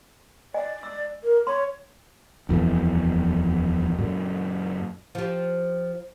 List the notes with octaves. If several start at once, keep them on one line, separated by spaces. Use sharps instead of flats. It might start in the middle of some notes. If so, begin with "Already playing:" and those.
D5 D#5 G#5
E6
A#4
C#5 C6
D#1 F2 B2 E3
F#2 A#2
F3 G4